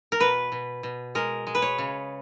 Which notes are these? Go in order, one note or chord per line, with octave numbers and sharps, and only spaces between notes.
A#4
B2 B4
B2
B2
G#3 A#4
G#3
B4
C#5
C#3